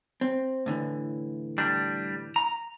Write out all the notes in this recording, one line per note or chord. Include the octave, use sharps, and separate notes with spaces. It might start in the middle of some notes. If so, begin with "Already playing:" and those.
C4
A2 D3 E3
G3 D4
A#5